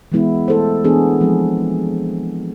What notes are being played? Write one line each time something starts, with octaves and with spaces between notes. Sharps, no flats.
E3 G#3 B3 E4
A3 E4 A4 C5
E3 B3 D4 G#4
F3 G#3 C4